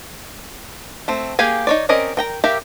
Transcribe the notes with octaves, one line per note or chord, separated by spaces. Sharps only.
A3 C4
A#3 G4 G#4 F5 G#5
D#4 C#5 D5
C4 C#4 A#4 D5 D#5
A#4 G5 A#5
G4 A#4 E5 F5